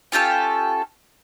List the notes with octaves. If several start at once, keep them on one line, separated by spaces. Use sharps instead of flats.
C#4 F4 G4 A4